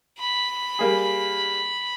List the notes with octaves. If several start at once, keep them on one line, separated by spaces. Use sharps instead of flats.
B5
G3 A#3 G#4